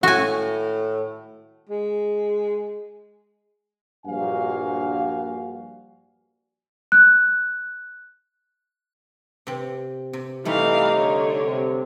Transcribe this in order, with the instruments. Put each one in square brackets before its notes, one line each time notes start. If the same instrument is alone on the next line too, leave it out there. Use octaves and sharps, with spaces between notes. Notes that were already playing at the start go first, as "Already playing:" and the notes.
[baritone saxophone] A2 [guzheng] F#4 G#5
[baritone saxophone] G#3
[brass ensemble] A#1 G2 A#2 F#4 F5 G#5
[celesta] F#6
[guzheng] C3 C4
C3
[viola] E3 F5 [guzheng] G3 A3 C6 [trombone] D#4
[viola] D3 C#5
[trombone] C3